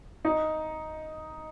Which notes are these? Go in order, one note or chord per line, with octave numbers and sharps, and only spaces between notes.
D#4